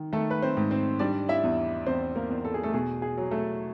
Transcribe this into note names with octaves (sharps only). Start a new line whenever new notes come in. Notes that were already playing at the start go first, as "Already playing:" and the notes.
Already playing: D#3
D#3 A3 A4
B4
C4 C5
G#2
C4 C5
G3 D4 D5
E4 E5
E2
E2 C4 C5
A#3 A#4
E2
A4
G#4
A3 A4
B2 G#4
G#4
F#3
A3 A4